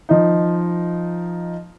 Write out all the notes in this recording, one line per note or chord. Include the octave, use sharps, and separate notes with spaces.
F3 D#4